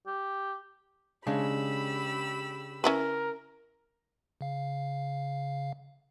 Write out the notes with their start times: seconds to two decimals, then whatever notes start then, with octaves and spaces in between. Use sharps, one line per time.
0.07 G4
1.27 C#3 G#3 D4 G4 B5 E6
2.84 C#4 E4 A#4 B4
4.41 C#3 F5